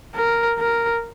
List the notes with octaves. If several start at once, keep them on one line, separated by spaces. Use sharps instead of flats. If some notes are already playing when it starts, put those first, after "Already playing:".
A#4
A#4